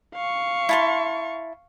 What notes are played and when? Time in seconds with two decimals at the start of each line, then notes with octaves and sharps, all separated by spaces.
0.15 F5 C#6
0.69 E4 A5 C6